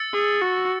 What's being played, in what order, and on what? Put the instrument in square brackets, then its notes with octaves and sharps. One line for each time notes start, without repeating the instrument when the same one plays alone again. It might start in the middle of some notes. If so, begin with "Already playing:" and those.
Already playing: [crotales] E6 A6 C#7
[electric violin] G#4
F#4